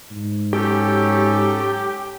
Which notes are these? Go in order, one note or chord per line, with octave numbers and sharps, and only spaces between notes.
G#2
F#3 C#4 G4 A4